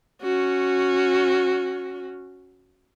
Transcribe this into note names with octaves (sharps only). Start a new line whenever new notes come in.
C#4 F#4